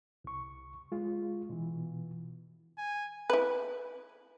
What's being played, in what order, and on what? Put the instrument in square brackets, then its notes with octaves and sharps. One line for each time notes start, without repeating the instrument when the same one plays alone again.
[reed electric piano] C2 C#6
G#3 F4
B2 E3
[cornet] G#5
[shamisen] E4 B4